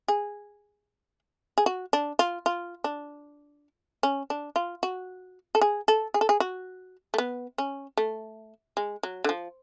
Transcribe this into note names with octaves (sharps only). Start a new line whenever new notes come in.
G#4
G#4
F#4
D4
F4
F4
D4
C#4
D4
F4
F#4
A4
G#4
A4
G#4
A4
G#4
F#4
A3
B3
C#4
A3
G#3
F#3
D3
F3